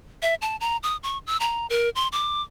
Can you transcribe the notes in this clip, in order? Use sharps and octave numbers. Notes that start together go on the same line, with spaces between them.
E5
A5
A#5
D#6
C#6
E6
A#5
A#4
C6
D6